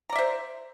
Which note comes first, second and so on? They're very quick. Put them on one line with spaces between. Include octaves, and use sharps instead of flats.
A#5 D5 E5 C5